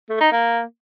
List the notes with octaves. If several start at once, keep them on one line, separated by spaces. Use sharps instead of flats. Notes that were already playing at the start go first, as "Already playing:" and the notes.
A3
D#4
A#3